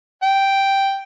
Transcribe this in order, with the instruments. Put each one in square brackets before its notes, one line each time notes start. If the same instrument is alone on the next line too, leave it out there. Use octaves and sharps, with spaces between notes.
[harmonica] G5